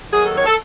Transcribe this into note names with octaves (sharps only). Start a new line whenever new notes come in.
D#2 D#3 F#3 G#4
A4
C#5
A4